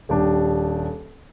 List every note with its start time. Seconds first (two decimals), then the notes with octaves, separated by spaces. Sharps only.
0.09 D#1 D4 G4